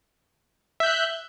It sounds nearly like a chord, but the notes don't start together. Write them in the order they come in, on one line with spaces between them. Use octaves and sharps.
E5 G6 F#6